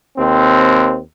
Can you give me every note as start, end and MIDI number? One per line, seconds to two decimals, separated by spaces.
0.17 0.99 39
0.17 0.99 60